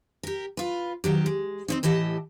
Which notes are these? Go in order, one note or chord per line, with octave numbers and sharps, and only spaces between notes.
G4 A#4
F4 B4
D#3 F#3 G4
G#3
C4 C#4 D#4
A2 E3 G4 D#5 A5